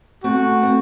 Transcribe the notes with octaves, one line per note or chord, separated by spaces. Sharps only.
A3 C4 F#4
A3 C4